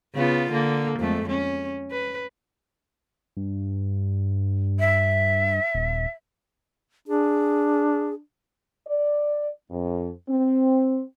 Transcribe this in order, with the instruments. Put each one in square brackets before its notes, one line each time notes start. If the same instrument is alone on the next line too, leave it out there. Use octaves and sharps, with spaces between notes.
[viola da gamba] C#3 B3 F4
D3 A#3
F2 G#3 A3
C#4
B4
[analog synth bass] G2
[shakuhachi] E5
[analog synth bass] D#1
[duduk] D4 [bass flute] G#4
[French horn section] D5
F2
C4